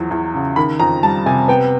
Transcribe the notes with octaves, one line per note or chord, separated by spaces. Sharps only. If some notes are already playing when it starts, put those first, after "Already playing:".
Already playing: E2 F3 F#3
E2
C#3
D#3 B5
F2 A#5
G3 A5
C3 G#5
B3 G5